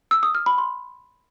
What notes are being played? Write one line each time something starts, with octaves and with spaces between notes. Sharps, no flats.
E6
D#6
F6
B5
C6